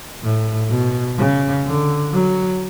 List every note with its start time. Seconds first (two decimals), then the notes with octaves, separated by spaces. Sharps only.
0.23 A2
0.70 B2
1.18 C#3
1.66 D3
2.13 F#3